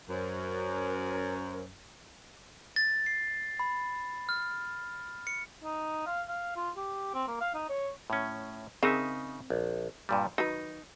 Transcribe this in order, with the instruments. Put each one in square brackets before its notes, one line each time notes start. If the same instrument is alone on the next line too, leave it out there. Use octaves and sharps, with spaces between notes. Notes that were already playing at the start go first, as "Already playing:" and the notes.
[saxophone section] F#2 [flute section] A#4 C5 C#5
[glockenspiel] A6
C7
B5
F6
C#7
[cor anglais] D#4
F5
F5
F4
G4
C4
A#3
F5
D#4
C#5
[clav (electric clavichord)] A2 C#4
[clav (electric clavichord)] C#3 D#4 E5 [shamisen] C4 G#4 A#4
[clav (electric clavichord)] A#1
G2 A#2 G3
[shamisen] D#3 F#3 B4 [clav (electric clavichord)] D#4